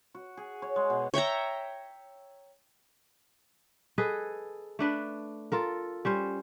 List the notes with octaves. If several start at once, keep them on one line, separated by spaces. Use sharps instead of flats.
F#4
G#4
C#5
G#3
B2
C#5 E5 G5 A#5
G#4 A4 B4 D#5
A3 D4 B4
F4 A4 A#4
G3 C#4 C5